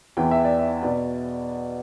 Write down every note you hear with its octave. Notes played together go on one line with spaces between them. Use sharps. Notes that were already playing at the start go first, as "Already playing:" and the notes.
E2 E3 B3 G5
E5
D5
E5
B2 B3 D5